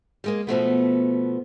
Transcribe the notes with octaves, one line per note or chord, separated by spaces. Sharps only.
G3 G#3 A#3
B2 F3 A3 B3